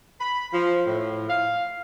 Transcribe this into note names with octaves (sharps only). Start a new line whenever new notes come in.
B5
F3
A2
F5